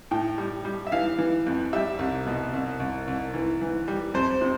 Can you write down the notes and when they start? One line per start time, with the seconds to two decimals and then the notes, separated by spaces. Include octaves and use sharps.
0.11 A2 G5
0.38 G3
0.65 G3
0.87 E5
0.92 E3 F5
1.18 E3
1.46 F2
1.73 G3 E5
1.99 C2
2.26 B2
2.54 C2
2.80 C2
3.08 C2
3.34 E3
3.61 E3
3.88 G3
4.14 F2 C5
4.42 C3